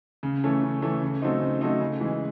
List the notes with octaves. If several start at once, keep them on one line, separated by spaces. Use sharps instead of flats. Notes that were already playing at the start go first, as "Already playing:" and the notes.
C#3
E3 A3 C#4
C#3
E3 A3 C#4
C#3
F#3 A3 C4 D#4
C#3
F#3 A3 C4 D#4
C#3
E3 G#3